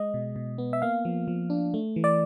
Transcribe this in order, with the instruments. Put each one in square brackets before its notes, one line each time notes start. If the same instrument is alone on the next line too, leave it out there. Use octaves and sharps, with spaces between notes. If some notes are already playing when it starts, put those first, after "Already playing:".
Already playing: [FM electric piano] G#3 D#5
B2
B2
B3
E5
A#3 F5
F3
F3
D4
A3
E3
D5